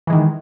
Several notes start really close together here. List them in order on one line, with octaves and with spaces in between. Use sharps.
E3 G#3 D#3